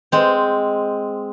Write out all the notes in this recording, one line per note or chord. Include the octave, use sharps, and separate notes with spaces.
G#3 C4